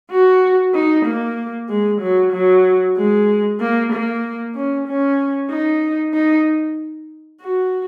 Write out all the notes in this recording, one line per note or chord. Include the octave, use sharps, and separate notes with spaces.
F#4
D#4
A#3
G#3
F#3
F#3
G#3
A#3
A#3
C#4
C#4
D#4
D#4
F#4